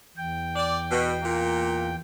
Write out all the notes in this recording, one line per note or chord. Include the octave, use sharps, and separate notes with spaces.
E2 G5
D5
B2
A#2 A#3